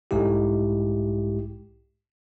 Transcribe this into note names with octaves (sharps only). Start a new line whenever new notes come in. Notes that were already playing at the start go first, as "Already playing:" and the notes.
B1 G#2 G#3 E4 G4